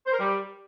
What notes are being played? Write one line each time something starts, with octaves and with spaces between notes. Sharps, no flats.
C5
A#4
G3